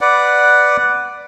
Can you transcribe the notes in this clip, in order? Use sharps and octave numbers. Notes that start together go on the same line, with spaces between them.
B4 D5 F#5